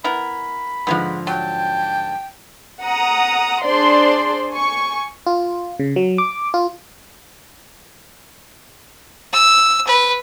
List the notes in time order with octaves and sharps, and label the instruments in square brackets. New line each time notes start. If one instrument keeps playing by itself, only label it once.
[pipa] B3 E4 A#4 [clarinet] B5
[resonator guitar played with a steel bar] G#2 D3 F3 [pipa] G#3 B3
[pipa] F#3 [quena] G5 [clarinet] A5
[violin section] F#5 A#5 D#6
D4 G#4 C5 D5 C6
G#5 C#6
[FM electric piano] F4
C#3
F#3
D6
F4
[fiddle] E6
B4